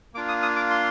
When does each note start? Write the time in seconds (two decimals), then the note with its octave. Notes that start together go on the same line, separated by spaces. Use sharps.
0.14 A#3 D4 F4 D6
0.29 D#6
0.42 D#6
0.56 D6
0.70 C6